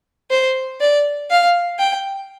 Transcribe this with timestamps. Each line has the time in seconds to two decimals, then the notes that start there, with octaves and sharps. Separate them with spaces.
0.30 C5
0.80 D5
1.30 F5
1.79 G5